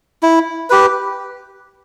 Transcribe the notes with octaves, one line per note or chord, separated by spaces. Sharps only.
E4
G4 B4